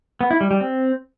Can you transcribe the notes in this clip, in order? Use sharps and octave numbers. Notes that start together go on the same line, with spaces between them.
B3
E4
G3
G3
C4